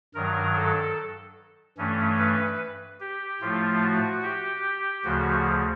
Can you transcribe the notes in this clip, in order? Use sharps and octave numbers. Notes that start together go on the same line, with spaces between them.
G2 D#3 F#3 A#4
A4
G2 E3 A3 C#4
B4
G4
A2 F3 A3 F4
F#4
G4
D2 C#3 F3 F#4